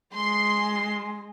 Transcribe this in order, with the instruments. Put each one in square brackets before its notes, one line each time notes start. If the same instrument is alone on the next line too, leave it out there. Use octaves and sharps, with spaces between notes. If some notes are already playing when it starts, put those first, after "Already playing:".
[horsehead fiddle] G#3 [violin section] C6